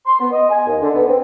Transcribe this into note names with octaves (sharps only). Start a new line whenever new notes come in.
C6
B3
D#5
G#5
D#2
D3
B3
C4